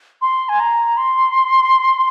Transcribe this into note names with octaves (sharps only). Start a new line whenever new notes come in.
C6
G#5
A#5
C6